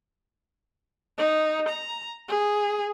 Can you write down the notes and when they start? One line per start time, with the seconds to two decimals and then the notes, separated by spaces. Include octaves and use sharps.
1.18 D#4
1.69 A#5
2.28 G#4